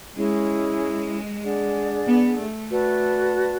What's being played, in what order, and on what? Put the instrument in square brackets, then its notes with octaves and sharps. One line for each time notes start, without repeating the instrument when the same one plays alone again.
[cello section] G#3 [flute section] C#4 E4 G#4
[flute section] D4 G#4 D5 F#5
[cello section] B3
A3
[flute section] F#4 B4 D5 A5